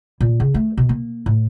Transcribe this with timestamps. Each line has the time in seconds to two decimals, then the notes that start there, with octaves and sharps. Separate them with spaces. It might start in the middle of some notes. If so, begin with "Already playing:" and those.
0.21 A#2
0.40 C#3
0.54 A3
0.77 B2
0.89 A#3
1.26 A2